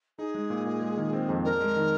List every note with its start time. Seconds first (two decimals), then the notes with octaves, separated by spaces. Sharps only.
0.18 D#4 G#4
0.35 G#3
0.50 A#2
0.65 A#2
0.81 G#3
0.97 D#3
1.13 C4
1.29 F2
1.44 D4 A#4
1.60 G#3
1.76 D#3